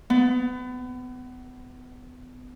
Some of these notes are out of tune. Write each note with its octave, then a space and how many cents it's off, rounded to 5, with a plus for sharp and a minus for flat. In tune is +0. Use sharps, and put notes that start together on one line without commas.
B3 +30